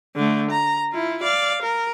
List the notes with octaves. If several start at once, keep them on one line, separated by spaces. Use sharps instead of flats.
D3 A3
A#5
E4 F4
D5 F5
A#4